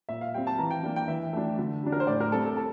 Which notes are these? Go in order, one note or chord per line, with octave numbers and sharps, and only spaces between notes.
A#2 E5
F5
G3 C4 G5
A5
E3 A#5
G5
A#3 D4
G5
E3 E5
A3 D4
D3
G3 D4
A#4
C5
A2 D5
A#4
G3 C4 A4
A4
A4